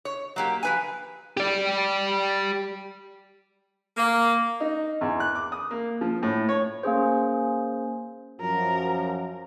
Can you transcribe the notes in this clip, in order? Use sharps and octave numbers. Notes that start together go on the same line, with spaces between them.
C#5
F#3 A#3 G4
F3 B4 G#5
G4 D5
A#3
D#4
E2
F#6
D6
D#6
A#3
F3
A2
C#5
A#3 C#4 G#4 C5
F#2 F3 A#4